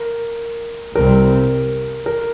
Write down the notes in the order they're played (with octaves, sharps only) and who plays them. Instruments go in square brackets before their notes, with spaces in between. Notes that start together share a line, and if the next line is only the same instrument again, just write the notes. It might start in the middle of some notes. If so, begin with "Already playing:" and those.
Already playing: [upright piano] A#4
[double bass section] C2 C3 G3 C4 [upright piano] A#4
[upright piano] A#4